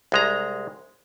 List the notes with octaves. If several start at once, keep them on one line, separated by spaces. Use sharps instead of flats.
C2 G#3 A#5